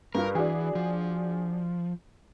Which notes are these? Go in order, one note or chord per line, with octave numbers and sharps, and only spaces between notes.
G2 F4 A#4
E3 D4 F#4 G#4
F3